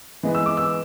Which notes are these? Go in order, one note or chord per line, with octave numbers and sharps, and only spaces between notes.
E3 G#3 B3
E6
D6
E6